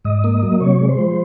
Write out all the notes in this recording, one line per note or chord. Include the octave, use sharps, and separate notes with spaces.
G#2 D#5
A#3
F#3
C3 C#5
G#3
C5
F3